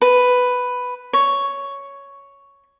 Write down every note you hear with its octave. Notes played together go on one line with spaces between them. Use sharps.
B4
C#5